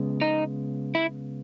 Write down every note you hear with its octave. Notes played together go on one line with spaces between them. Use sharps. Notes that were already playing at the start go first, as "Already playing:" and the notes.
Already playing: C#3 G#3 B3
D#4
E4